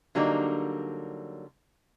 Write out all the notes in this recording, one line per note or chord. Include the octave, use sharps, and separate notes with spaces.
D3 F#3 G3 A#3 D4 D#4